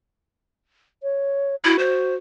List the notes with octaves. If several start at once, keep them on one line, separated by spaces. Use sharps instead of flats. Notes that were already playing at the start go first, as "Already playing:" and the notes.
C#5
E4 F#4
C5